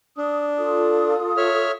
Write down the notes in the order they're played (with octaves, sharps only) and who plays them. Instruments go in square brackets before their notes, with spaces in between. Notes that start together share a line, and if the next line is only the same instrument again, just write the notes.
[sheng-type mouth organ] D4 [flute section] D#6
[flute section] F4 A4 D#6
[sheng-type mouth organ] C#5 E5 F6